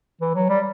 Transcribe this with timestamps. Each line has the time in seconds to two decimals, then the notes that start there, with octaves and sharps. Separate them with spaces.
0.21 E3
0.35 F#3
0.49 G3